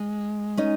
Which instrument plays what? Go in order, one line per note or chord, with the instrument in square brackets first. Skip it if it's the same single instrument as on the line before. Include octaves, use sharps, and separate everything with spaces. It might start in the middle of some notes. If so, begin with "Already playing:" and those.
Already playing: [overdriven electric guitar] G#3
[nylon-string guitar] C#4 D#4